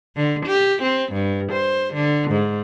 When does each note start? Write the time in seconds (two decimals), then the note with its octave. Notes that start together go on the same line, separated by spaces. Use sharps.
0.16 D3
0.46 G4
0.83 C4
1.13 G2
1.53 C5
1.94 D3
2.31 G#2